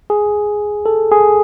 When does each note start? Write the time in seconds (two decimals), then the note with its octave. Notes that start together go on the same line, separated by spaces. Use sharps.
0.10 G#4
0.86 A4
1.11 G#4